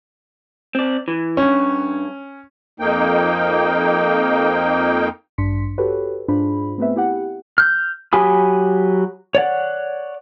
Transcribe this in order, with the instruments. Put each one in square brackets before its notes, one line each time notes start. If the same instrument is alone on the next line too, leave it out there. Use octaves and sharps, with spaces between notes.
[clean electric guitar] C4 D5
E3
[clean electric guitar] G2 C#5 [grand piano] C#4
[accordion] F2 A#3 D#4 G5
[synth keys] A1 G2 D4 C6 B6 C#7
F#4 G4 A4 B4 C#5
G#2 D4 F4 G#4 C5 B5
A3 B3 C4 G#4 B4 E5
E4 G4 F#5
[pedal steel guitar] F6 G6
F#3 G4 G#5 B5 D#6
C#5 D5 F#5